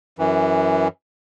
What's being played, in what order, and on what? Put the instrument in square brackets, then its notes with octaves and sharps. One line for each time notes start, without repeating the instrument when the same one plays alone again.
[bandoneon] F#2 E3